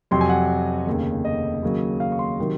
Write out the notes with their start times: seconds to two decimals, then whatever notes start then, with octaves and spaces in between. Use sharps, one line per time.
0.11 F2 C3 F#3 C6
0.21 G#5
0.29 F#5
0.86 F1 D#2 C#3
1.25 D#5
1.63 D#2 C#3 F#3
2.00 F5
2.12 C#6
2.19 C6
2.39 C3 D#3 F#3